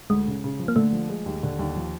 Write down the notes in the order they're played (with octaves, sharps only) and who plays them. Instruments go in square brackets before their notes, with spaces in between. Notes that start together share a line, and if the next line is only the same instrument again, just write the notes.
[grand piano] D2 [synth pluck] G#3
[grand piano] C#3
C#3
F3
[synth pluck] A#3
[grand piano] D3 [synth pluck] A3
[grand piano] F3
G#3
D#2
D3
D#2
F3